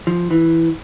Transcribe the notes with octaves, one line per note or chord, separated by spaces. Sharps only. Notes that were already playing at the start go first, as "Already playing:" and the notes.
F3
E3